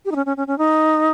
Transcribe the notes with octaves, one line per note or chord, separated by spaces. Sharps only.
G4
D#4
C#4
C#4
C#4
C#4
D#4